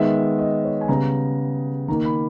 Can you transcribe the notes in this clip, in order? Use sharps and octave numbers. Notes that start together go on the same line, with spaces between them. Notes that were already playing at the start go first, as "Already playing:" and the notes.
Already playing: D#3 G#3 B3 E5
D#5
C#5
G#5
C#3 G3 B3 A#5
D#3 A#3 A#5
B5